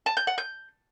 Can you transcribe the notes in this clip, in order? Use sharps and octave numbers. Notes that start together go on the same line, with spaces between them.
A5
G6
F#5
G6